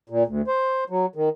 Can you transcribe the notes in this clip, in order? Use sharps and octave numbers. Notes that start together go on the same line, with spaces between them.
A#2
D2
C5
F#3
D#3